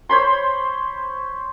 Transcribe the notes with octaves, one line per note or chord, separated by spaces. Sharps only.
C5 C#5 B5 C6